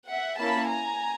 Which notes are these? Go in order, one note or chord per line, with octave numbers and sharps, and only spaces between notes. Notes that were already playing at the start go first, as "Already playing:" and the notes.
E5 F#5
A#3 C#4 E4 A5 B5
G#5 A#5